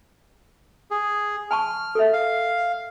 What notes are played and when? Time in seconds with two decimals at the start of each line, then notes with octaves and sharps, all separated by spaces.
0.91 G#4
1.51 G#5 A5 C#6 F6
1.95 A4 E5
2.13 F5